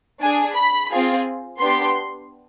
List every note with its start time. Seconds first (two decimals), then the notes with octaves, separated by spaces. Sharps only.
0.21 D4 G#4 G#5
0.56 B5
0.91 C4 F4 G#4
1.60 B3 D4 G4 C6